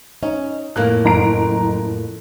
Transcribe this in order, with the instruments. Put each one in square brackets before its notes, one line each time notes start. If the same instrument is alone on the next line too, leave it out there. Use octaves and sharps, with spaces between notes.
[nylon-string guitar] C#4 [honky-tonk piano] D#4
[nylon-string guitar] F2 A2 A#3 [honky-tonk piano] F#6
[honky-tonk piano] F#1 A#5 D7